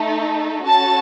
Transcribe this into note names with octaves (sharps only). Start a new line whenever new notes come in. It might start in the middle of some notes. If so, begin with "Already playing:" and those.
Already playing: A3 D#4 A4
C#4 F#4 A4 A5